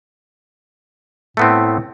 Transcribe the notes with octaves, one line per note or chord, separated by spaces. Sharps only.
A2 A3 B3 C4